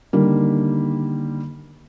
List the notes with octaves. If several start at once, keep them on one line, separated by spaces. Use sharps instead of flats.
D3 D#3 G3 A#3